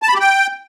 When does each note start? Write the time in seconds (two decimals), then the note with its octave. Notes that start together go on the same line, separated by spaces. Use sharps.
0.02 A5
0.08 B5
0.14 G4
0.20 G5